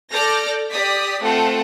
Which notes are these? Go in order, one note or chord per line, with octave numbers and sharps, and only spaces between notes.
A4 D5 D6 F6 G6 A#6
G4 D5 D#6 B6
A3 C4 F4 A4 F#5